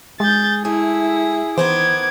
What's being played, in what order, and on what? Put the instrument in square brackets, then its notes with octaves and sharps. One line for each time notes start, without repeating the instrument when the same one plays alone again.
[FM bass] G#3 [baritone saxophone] G#4 [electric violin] G6 A6
[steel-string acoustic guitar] A3 [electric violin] E4 [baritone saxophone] G#4
[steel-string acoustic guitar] D#3 B3 C5 [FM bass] E3 [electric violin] D6 G#6